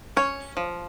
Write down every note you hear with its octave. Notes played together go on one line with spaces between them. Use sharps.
C#4 C#5
F3